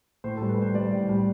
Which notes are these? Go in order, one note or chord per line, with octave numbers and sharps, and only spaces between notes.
A2 C5
G3 A4
B4
G3 C5
G3 D5
A2
G3